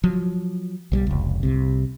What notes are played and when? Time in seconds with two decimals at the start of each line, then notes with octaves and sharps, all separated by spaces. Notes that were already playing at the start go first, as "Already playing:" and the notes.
0.04 F3 F#3
0.92 B1 F#3 G3
1.07 F1 C#2
1.43 C2 C3